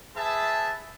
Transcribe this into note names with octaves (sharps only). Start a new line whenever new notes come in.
G#4 B4 E5 A5